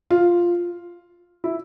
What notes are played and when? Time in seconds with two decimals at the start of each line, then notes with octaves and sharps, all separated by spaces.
0.11 F4
1.44 E4